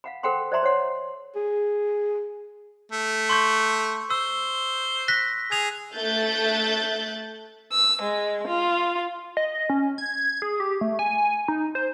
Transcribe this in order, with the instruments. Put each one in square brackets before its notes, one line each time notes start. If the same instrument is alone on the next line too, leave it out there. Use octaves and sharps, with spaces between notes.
[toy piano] F5 F#5 B5
A4 C5 F#5 G5 B5 C6
C5 D5 E5 G#5 A#5 C6
C5 C#5 F#5 C6
[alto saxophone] G#4
[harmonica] A3
[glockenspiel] C6 C#6 G6
[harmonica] C5 [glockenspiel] E6
[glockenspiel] F#6 A#6 B6
[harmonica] G#4 [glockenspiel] G#6 F7
[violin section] A3 E5 F#6 G6 A6
[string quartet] E6
G#3
F4
[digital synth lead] D#5
C#4
G#6
G#4
G4
A3
G#5
D#4
C5